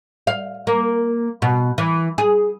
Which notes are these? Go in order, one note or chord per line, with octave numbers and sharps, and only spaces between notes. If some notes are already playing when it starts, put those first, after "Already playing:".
F5
A#3
B2
E3
G#4